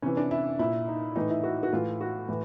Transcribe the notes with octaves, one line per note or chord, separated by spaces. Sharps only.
C3 E3 C#4
D4
E4
A#2 E4
D#4
A2 E3 D#4
E4
F#4
F#4
A2 E3 F4
F#4
A2 E3